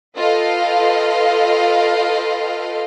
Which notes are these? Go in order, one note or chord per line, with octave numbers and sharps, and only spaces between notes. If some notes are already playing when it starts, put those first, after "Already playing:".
F4 A4 B4 D#5 F5 G5